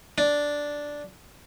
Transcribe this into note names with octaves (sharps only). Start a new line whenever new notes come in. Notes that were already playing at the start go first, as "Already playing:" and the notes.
D4